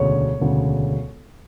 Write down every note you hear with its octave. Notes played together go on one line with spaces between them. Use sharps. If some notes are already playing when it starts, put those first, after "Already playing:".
Already playing: E1 D2 C#3 C#5
E1 D2 C#3